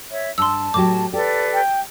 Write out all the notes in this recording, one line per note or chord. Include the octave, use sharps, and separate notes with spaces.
C#5 E5
G2 A5 C6 E6
A2 F#3 G4 D6
G4 A4 B4 D5
G5